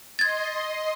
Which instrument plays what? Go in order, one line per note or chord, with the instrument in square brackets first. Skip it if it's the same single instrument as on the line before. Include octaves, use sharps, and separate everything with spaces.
[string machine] D#5 C6 [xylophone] G#6 A6